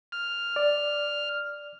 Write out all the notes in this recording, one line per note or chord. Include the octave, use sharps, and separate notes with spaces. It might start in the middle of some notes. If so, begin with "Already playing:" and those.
F6
D5